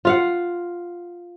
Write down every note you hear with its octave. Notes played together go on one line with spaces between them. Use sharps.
F4 F5 F#5